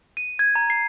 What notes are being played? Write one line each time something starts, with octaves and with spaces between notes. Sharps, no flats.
D#7
G#6
A#5
C7